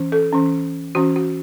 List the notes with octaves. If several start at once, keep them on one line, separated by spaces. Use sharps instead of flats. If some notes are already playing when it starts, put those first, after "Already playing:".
Already playing: E3 C#4
A4
E3 C#4
E3 C#4 F#4
F#4